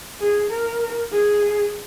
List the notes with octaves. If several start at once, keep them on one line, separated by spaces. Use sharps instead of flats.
G#4
A#4
G#4